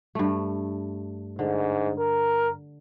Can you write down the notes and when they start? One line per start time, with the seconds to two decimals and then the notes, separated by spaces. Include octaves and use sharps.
0.15 G2 A3
1.39 G#2 D3
1.99 A#4